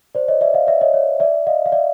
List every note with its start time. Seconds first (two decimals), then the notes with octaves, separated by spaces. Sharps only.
0.15 C5 D5
0.28 C#5 D#5
0.41 D5 E5
0.54 D#5 F5
0.67 D5 E5
0.81 C#5 D#5
0.94 C#5
1.20 D5 E5
1.47 D#5 F5
1.66 F5
1.72 D5 E5